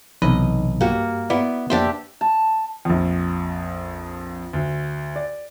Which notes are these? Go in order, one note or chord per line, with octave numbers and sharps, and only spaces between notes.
B1 C3 E3 D#4 B4 D#5
G2 A#3 F#4 G4
B3 E4 D5
F2 A#3 D4 G4 C5 E5
A5
A#1 F2
D2
D5